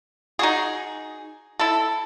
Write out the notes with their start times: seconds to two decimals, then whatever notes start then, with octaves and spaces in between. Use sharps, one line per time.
0.39 D#4 F#4 G#4
1.59 E4 A4